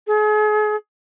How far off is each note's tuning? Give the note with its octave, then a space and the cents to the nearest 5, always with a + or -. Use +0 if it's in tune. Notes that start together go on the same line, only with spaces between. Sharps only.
G#4 +40